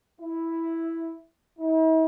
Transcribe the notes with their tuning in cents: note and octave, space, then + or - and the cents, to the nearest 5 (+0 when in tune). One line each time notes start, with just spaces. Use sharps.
E4 +0
E4 -45